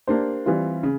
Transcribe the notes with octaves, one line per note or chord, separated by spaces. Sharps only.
A#3 D4 G4 C5
E3 G3 C4 F4
C#3